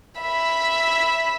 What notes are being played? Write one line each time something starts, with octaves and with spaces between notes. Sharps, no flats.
E5 B5